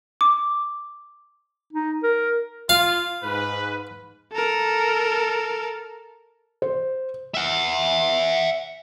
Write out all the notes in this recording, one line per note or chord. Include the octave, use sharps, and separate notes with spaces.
D6
D#4
A#4
F4 F5
G#2 B4
A4 A#4
C5
E5 F#5